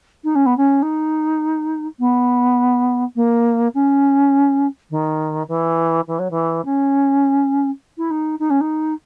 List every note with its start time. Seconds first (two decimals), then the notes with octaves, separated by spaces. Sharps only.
0.24 D#4
0.35 C#4
0.46 B3
0.57 C#4
0.82 D#4
1.99 B3
3.15 A#3
3.74 C#4
4.90 D#3
5.48 E3
6.07 E3
6.19 F#3
6.30 E3
6.65 C#4
7.97 E4
8.10 D#4
8.39 D#4
8.50 C#4
8.60 D#4